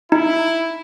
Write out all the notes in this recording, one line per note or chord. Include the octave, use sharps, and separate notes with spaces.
D#4 E4